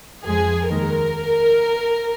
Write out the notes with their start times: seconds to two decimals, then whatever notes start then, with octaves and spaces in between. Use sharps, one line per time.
0.24 F2 F3 G#3 G#4
0.69 D#2 D#3 G#3 A#4